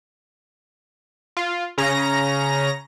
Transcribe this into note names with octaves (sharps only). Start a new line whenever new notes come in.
F4
C#3 C#4 A#5 A#6